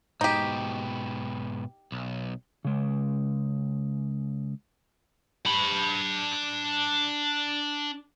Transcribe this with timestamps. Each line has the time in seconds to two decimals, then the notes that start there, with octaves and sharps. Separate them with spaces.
0.21 G#2 B2 D#4 G4
1.92 B1
2.65 C#3 G#3
5.46 D4 B5